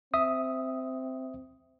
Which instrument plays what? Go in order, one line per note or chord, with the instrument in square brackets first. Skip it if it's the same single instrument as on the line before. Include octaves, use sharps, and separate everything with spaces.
[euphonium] C4 [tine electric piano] E5 D#6